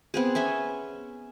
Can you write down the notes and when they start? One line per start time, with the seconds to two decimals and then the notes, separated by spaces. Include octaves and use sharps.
0.14 B3 C4 G#4
0.35 C#4 E5 G#5